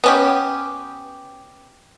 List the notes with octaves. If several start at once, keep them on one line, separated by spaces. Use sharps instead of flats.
B3 C#4 G4